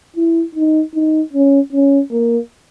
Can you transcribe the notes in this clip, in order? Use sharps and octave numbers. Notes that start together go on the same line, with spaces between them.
E4
D#4
D#4
C#4
C#4
A#3